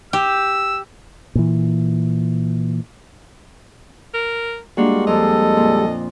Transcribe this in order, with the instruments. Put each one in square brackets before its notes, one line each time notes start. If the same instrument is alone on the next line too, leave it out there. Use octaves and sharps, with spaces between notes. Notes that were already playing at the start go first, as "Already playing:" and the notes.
[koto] G4 [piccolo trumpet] E6
[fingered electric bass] A#2 E3
[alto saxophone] A#4
[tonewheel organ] G3 G#3 [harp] A#3 D4 F4 [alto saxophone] F#4
[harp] F2 [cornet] A4 [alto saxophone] D#5
[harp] A#2